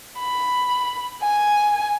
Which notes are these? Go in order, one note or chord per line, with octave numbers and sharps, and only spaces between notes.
B5
G#5